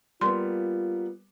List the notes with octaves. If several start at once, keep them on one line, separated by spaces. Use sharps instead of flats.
G3 A#3 B3 F4 C6